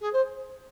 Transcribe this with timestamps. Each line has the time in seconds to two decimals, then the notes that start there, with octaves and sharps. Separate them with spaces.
0.01 G#4
0.13 C5